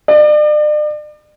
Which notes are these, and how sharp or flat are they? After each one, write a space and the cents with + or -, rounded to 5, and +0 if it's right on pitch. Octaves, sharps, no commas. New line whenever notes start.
D5 +40